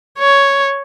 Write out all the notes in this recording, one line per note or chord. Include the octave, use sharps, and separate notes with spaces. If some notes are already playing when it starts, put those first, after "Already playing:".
C#5